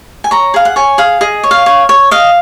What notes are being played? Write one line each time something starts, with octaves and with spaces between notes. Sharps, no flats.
G#5
C#5 A#5
G#4 F5
F#5
C#5 G#5
G#4 F5
G#4 D#5
C#5
F5
C#5
C#5
D#5 F5